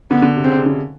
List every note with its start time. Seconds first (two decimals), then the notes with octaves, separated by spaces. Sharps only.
0.11 D3 B3
0.22 D3
0.36 C3
0.44 C#3 C4
0.55 C#3
0.66 D3